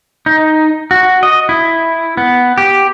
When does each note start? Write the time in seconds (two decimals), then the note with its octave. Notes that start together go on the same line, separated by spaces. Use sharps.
0.26 D#4
0.91 F#4
1.23 D#5
1.49 E4
2.17 B3
2.58 G4